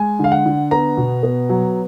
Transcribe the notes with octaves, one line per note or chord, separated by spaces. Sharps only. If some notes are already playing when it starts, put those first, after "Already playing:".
Already playing: G#3 G#5
D3 F5
F#5
D3
B3 A#5
B2
B3
F#3